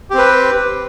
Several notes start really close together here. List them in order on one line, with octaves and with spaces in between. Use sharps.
G4 C4 B4